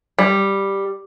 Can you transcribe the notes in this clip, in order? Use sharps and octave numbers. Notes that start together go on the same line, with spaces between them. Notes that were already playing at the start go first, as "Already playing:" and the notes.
G3